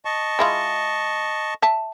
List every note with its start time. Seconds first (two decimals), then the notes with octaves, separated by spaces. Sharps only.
0.05 D#5 A5 C#6
0.39 G#3 E4 F4
1.62 E5 A5